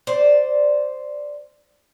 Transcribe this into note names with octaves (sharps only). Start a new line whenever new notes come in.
C5 D5